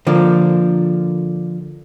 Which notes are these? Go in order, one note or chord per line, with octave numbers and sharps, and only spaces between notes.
D3 F3 A#3